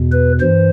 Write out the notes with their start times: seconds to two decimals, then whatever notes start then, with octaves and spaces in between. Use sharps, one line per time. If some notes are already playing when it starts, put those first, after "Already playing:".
Already playing: E2 B2
0.12 B4
0.41 G2 E3 C5